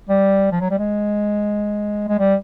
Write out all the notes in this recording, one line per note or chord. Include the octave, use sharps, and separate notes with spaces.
G3
F3
F#3
G3
G#3
G#3
G3